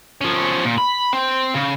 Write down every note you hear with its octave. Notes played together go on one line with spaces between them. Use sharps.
F3 C#4
A#2
B5
C4
C#3